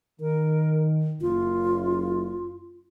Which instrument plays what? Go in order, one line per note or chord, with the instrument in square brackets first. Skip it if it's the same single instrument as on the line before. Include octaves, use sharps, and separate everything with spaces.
[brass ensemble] D#3 [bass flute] A#4
[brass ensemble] F#1 F#2 [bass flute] F4